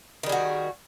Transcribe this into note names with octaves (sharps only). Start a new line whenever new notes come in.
D#3 G3 F#4 G#4